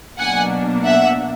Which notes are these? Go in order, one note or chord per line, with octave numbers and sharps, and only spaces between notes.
B2 F#3 A#3 D4 F#5 G#5
E5 F#5